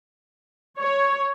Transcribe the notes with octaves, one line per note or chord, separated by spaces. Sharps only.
C#5